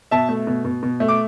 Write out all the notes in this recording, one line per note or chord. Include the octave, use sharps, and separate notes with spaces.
B2 E5 A5
A3
B2
B2
B2
A3
D6